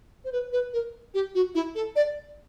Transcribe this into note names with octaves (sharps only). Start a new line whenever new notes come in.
C5
B4
B4
A#4
G4
F#4
E4
A4
D5